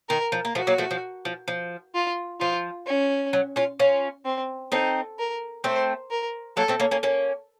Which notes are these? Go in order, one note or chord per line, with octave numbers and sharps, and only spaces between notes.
D#3 A#4
F3
A#3
F3 A3 F#4
F#3 A#3
F3 A3
F3
F3
F3
F4
F3 F4
C#4
F#3
C#4 F4
C#4 F4
C4
C4 D#4 A4
A#4
A3 C4 C5
A#4
F#3 A#3 A4
A3 C4
A#3 C#4
A#3 C#4
A#3 C#4